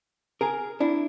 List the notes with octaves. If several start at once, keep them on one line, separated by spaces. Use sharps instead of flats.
G#4 A#4
D4 E4